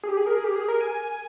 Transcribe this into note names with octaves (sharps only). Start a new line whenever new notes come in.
G#4
G4
G#4
A#4
G#4
G4
G#4
A#4
G#5